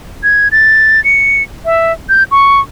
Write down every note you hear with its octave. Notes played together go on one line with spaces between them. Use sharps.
G#6
A6
C#7
E5
G6
C#6